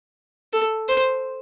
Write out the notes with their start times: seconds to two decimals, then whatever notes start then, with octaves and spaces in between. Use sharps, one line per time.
0.53 A4
0.89 C5